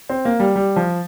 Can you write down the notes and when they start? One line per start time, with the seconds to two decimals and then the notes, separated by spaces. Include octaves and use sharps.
0.09 C4
0.25 A#3
0.40 G3
0.56 G3
0.76 F3